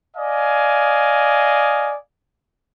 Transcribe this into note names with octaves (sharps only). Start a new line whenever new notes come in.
D5 D#5 F5 G#5